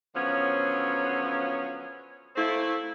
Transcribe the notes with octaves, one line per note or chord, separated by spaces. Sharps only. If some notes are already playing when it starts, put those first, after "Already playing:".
D3 F3 F#3 B3 C#4
A3 A#3 C4 E4